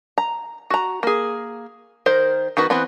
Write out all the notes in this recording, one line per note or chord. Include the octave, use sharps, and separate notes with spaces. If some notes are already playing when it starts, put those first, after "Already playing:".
A#5
F#4 A#5
A#3 G#4
D#3 A#4 C5
D#3 B3 F#4 B4
E3 B3 C4 B5